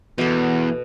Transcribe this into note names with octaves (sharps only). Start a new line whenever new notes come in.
E2 B2 A4